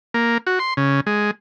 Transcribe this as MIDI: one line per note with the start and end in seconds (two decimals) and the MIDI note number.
0.14 0.38 58
0.47 0.59 66
0.59 0.74 84
0.77 1.01 49
1.06 1.31 56